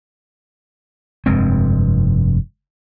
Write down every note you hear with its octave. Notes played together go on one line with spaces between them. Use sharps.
F1 G2 G#3 C4